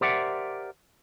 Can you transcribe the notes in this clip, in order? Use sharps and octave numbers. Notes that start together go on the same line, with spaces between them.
G4 A#4 C5 D5 E5 F#5